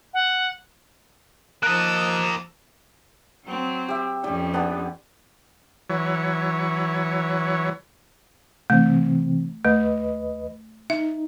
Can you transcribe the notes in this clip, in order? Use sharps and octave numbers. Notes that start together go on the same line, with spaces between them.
F#5
F3 A#3 D#5 A5 E6 F#6
F#3 C4
G4 E5
F2 C#4 G4 D5 G5
B3 D4 G4
E3 F#3 C#5
C3 E3 A3 C4
D#2 A3 B4 D#5
D#4 E5